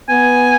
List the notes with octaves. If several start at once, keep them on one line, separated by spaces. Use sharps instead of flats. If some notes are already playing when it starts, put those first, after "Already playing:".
B3 G#5